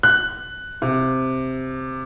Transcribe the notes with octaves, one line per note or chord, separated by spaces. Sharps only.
F#6
C3